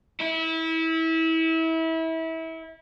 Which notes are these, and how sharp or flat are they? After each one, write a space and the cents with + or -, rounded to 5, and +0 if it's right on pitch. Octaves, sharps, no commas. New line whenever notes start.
E4 -25